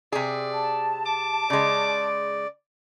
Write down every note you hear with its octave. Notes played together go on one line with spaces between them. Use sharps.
C3 G#4 D5
A5
D6
C#3 G#3 D5